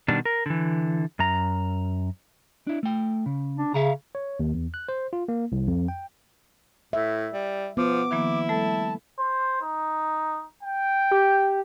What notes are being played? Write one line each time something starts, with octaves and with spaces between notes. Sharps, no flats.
B2 D#3 G3 D4
A#4
D3 E3
F#2 A#5
D4 E4
A3 G5
C#3
D4
C#3 E5 F5 A#5
C#5
D#2
E2
F#6
C5
F4
A#3
C2
F2
G5
A2 E5
G3
F3 B3 D6
D#3 F3 A#3 E4
G3 A3 A4 A5
C5
D#4
G5
G4